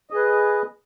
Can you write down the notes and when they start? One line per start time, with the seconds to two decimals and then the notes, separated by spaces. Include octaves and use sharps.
0.10 D#5
0.13 G#4
0.16 B4